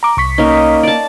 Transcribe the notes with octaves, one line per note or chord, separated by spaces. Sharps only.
A#5 D6
C2 C#6 B6
A#3 C#4 D#4
D5 A5